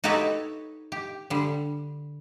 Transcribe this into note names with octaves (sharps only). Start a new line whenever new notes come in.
D#4 F#4 G4 A4 B4 C#5
G4
D3 G3